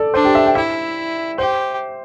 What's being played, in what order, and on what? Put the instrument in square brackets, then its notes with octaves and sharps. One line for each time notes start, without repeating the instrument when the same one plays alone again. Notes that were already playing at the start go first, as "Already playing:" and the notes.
Already playing: [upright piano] A4 D5
[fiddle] D4 [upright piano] C5
[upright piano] G4
E5
G5
[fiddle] E4 [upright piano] E5
[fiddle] G4 [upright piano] C5